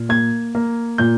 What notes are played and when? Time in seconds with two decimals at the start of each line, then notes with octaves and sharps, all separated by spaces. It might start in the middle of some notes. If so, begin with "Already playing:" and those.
Already playing: A#2
0.09 A#3 G#6
0.55 A#3
0.98 A#2 G6